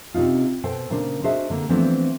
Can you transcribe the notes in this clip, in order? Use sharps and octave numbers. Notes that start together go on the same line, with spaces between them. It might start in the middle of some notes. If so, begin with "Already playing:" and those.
C3 C#4 D#4 F4
B2 A4 C5 G5
A#2 C#3 D4 C5
D4 F#4 G#4 C5 D#5 E5
D3 A#3
E3 F3 A3 B3 C4 D4